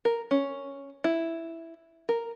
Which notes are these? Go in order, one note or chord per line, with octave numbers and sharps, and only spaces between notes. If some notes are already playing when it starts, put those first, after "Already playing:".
A#4
C#4
E4
A#4